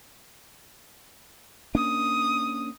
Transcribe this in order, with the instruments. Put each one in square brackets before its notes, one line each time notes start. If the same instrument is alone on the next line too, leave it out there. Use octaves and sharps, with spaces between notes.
[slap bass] A#3 C#4 D4 [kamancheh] D#6